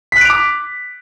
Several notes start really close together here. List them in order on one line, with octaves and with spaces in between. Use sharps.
B6 F#6 D7 F7 D6